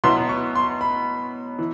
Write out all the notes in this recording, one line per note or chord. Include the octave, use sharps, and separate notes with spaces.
B2 F#3 B3 E4 C6
C#6
C6
B5
E3